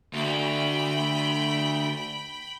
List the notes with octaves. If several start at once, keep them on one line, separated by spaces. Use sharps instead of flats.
D2 G5 B5